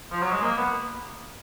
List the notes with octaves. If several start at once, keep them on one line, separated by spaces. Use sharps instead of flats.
F3
F#3
G#3
A#3
B3